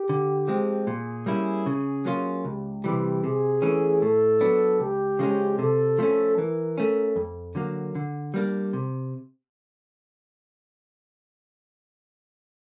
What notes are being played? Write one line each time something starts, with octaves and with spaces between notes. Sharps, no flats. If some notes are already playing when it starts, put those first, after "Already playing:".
Already playing: G4
D3
F3 G#3 C4
A#2 G#4
G3 A#3 C#4 E4
C#3
F#3 A#3 C#4 F4
C#2 G4
C3 E3 G3
C3 G#4
E3 A3 C#4
A2 A4
F#3 B3 D4
C#2 G4
C#3 F3 G#3 C#4
C3 A4
F3 A3 C#4
E3 A#4
A3 C#4
F2
D3 F#3 A#3
D3
G3 A#3 D4
C3